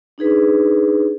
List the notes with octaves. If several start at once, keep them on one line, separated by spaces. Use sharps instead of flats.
D4 D#4 G#4 B4